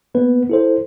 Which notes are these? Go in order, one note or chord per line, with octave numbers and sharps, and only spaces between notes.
A#3 B3 B4
E4 A4 C5